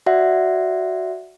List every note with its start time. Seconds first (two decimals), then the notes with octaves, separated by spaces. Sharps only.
0.06 F#4 D5 E5 F#5